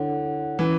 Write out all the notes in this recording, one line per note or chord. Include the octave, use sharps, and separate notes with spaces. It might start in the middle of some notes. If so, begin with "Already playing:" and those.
Already playing: D3 E4 A4 C#5 F#5
E3 C#4 E4 B4